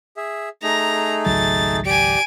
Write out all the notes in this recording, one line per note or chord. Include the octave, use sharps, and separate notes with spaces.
G#4 E5
A3 D#4 G#4 A#5
G#1 C#2 F#3 A6
G4 D5 G#5 D7